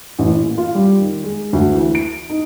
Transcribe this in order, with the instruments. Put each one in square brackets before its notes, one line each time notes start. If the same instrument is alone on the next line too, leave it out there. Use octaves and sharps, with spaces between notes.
[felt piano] A1
A#2
F4
G3
D#3
G#3
D2
E3
D7
D#4